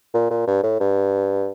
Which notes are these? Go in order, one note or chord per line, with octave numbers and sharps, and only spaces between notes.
A#2
A#2
G2
A2
G2